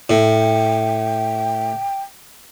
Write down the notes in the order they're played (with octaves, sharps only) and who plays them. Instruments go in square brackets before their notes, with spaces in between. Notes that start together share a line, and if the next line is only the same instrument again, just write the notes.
[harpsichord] A2 [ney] G5